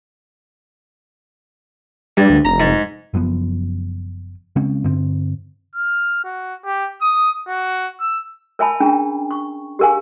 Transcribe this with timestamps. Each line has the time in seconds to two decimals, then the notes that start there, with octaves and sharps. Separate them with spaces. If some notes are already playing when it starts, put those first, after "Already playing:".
2.17 G2 G3
2.30 D2
2.45 F1 A#5
2.60 G#2
3.14 F#1 F#2 F3 B3
4.56 C#3 G#3 C4 C#4
4.84 G2 D3 C4
5.75 F6
6.24 F#4
6.65 G4
7.02 D#6
7.48 F#4
8.00 E6
8.59 A#4 C#5 E5 G#5 A5 B5
8.80 C#4 D4 G#4 G5 A#5
9.31 C#6
9.79 G4 G#4 A#4 F5 G#5